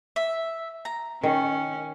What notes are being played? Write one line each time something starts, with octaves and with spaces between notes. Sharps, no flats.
E5
A#5
D#3 C#4